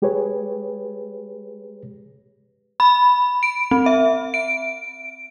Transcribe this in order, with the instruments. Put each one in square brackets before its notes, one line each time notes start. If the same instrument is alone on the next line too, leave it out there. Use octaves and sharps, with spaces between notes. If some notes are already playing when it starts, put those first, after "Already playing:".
[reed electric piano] G#3 G4 G#4 B4 C#5
[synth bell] B5
D7
C4
E5
D7